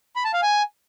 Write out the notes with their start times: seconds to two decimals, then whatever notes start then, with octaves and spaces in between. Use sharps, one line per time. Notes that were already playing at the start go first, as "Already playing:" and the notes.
0.16 B5
0.25 A5
0.33 F5
0.42 G#5